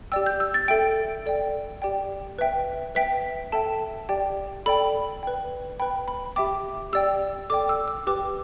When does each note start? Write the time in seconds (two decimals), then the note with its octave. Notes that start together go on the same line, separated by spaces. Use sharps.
0.12 G4 D5 G5 E6
0.26 G6
0.40 E6
0.54 A6
0.68 A4 E5 G5 D7
1.26 A4 D5 G5
1.82 G4 D5 G5
2.39 B4 E5 G5
2.95 B4 E5 G5 B6
3.52 A4 E5 G5 A5
4.09 G4 D5 G5
4.66 A4 D5 G5 B5
5.23 B4 G5
5.80 B4 G5 B5
6.08 B5
6.36 G4 E5 G5 D6
6.93 G4 D5 G5 E6
7.50 A4 D5 G5 D6
7.69 E6
7.88 E6
8.07 G4 B4 G5 D6